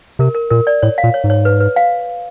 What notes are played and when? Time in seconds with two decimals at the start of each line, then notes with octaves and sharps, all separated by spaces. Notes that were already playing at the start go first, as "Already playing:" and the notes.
0.19 C3 A#4
0.35 A#4
0.50 A#2 A#4
0.67 D5
0.82 A2 C#5
0.98 F5
1.04 A#2
1.14 C#5
1.24 G#2
1.30 C#5
1.45 B4
1.60 B4
1.76 F5